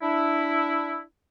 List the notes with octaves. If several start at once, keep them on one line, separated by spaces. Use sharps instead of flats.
D4 E4